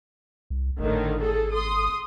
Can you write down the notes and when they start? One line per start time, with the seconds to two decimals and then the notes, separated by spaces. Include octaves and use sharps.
0.50 C2
0.80 G#1 A2 D3 D#3
1.21 G#4 A4
1.53 C6 D#6